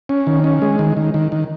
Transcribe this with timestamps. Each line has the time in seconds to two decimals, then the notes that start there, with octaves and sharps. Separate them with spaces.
0.09 C#4
0.27 D#3
0.44 C#4
0.62 G#3
0.79 D#3
0.97 D#3
1.14 D#3
1.32 D#3